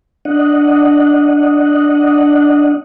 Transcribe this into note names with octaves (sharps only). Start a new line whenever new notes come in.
D4 D#5 F#5